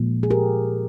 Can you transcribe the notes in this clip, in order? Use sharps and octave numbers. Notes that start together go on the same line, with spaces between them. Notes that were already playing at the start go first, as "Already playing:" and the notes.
Already playing: A#2 F3 G#3
G#4
G4 A#4